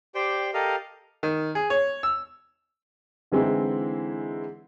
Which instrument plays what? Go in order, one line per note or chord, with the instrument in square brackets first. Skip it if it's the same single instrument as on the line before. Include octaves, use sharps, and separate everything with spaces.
[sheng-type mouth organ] G4 C5 D5 G5
G4 A4 A#4 D#5 F5
[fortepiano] D#3
G#4
C#5
E6
[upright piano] D3 E3 G#3 C4 D#4 E4